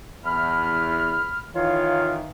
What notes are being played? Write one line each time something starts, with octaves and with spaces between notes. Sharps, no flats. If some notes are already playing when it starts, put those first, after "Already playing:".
E2 B5 F6
D#3 E3 F4 C#5 F5